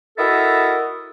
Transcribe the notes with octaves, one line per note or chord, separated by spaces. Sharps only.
E4 F#4 A4 A#4 D#5 E5